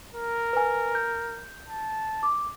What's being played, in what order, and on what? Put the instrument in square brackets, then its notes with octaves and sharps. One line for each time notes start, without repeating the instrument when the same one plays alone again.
[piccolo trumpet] A#4
[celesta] B4 G#5
G6
[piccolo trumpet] A5
[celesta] D6